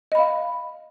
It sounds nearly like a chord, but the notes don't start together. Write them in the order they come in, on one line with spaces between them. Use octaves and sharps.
D#5 B5 F5